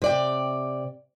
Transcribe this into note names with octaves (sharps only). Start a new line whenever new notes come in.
C3 D5 G5